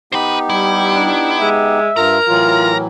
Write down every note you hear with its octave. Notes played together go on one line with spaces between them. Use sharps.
B3 D#4 G4 C5 B5
G3 E4
D4
G#3 E5
G2 F4 A#4 A#5
A2 E3 F#3 F4